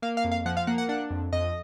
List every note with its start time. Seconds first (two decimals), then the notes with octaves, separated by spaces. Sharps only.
0.02 A#3 F5
0.17 F5
0.24 F2
0.32 F5
0.46 F3 F#5
0.57 F5
0.67 A#3 F#5
0.78 F#5
0.89 D4 F#5
1.10 F2
1.32 F2 D#5